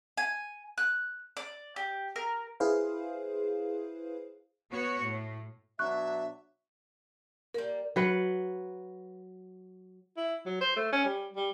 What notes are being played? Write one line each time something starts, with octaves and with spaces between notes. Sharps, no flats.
G#5
F#6
D5
G4
A#4
E4 G#4 B4 C5 F5
B3 F#4 C#5
A2
B2 F#3 D4 E5 C#6 F#6
G3 A#3 A#4
F#3 B4 F#5
E4
F#3
C5
A3
C#4
G3
G3